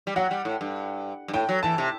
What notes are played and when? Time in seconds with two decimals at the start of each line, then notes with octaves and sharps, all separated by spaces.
0.07 G3
0.16 F#3 F#5
0.31 G3
0.45 A2
0.61 G2
1.28 G2
1.33 A2 G5
1.49 F#3
1.63 E3 A5
1.78 C3